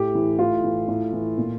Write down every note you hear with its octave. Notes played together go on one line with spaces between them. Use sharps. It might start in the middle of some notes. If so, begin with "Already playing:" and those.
Already playing: A2 G4
E3
A2 F4
E3
A2
E3
A#2